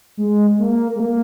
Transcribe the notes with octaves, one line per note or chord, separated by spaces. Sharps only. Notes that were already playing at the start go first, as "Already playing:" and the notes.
G#3
A#3
G#3
A#3